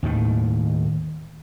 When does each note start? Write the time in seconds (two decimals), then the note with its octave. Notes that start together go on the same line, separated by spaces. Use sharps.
0.03 D#2 A2 D#3